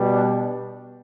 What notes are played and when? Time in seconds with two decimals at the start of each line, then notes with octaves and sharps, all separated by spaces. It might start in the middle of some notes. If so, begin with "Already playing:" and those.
Already playing: B2 G3
0.12 D4